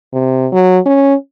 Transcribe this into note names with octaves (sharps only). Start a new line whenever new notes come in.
C3
F#3
C#4